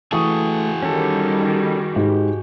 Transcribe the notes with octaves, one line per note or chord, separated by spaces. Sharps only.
E3 A3 F#4 G#4 C#6 D#6
D#3 G3 C#4 A4
G#2 G4